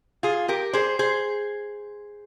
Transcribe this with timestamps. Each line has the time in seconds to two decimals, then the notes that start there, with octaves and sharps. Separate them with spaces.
0.23 F4 G#4
0.48 G4 A#4
0.73 G#4 C5
0.99 G#4 C5